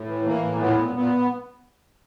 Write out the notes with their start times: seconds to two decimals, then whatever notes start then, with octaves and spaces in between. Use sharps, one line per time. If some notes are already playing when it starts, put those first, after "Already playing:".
Already playing: A2
0.08 E3
0.25 E3 A#3
0.43 A2
0.60 A#2 B3
0.78 A#2
0.95 A#2 B3